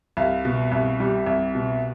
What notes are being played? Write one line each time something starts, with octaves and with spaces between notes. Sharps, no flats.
C2 F5
B2
C2
G3
C2
B2